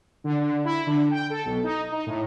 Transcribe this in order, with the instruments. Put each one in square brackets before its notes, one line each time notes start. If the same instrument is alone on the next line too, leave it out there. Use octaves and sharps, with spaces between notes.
[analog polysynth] D3
D3
E4
D3
G5
A4
B1
D#4
D#4
A2